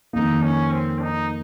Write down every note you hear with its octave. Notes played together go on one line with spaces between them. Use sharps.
F2 D#3 A#3 D#4
C#4
C4
D#4